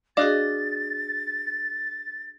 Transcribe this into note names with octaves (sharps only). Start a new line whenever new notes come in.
D4 F#4 G#4 D5 D#5 F5 A6